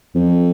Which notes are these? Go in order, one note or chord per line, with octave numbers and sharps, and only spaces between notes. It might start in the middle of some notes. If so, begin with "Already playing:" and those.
F2